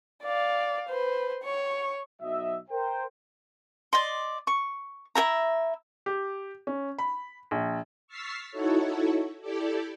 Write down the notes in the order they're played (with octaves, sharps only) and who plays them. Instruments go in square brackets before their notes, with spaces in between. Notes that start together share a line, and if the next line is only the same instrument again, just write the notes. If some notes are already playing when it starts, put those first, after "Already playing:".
[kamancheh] D5 F5
B4 C5
C#5 C#6
[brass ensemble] B1 F#3 D#5 E5
A#4 C5 G5
[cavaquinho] D5 D#5 C6
C#6
E4 A4 E5 A#5
[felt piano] G4
C#4
B5
A#1
[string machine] C#6 E6 F6 A6 B6 C7
D#4 E4 F#4 A4 C#5
E4 G4 A4 D5